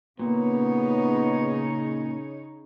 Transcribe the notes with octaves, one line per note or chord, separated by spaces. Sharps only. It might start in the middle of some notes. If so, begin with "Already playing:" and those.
A#2 C#3 B3 D#4 C#5